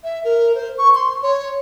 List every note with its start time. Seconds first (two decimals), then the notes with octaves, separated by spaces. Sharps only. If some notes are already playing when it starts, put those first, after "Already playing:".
0.04 E5
0.25 A#4
0.55 C5
0.78 C#6
0.95 C6
1.22 C#5